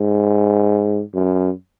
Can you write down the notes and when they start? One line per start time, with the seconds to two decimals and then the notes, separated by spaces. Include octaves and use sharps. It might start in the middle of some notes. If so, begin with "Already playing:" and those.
Already playing: G#2
1.14 F#2